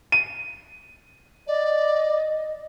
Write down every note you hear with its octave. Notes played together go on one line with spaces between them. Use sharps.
D#7
D5 D#5